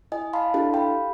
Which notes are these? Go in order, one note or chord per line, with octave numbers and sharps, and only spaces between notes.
E4 D#5 G#5
F5 A5 B5 C6
D4 E4 G4 A4
G4 F5 G5 B5